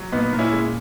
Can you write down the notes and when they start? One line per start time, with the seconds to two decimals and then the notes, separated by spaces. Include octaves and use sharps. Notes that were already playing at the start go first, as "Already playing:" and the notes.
Already playing: F#3
0.12 A#2 B3 D#4
0.33 A#2
0.39 C#4 E4
0.52 G#3